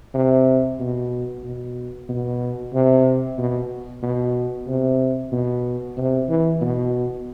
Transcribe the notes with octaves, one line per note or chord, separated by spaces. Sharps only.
C3
B2
B2
B2
C3
B2
B2
C3
B2
C3
E3
B2